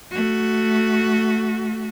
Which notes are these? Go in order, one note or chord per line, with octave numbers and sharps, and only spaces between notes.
A3 F#4